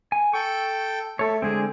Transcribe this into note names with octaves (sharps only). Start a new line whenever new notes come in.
G#5
A4 G5 C#6
A3 A4 C#5
D3 G#3 C4 G#4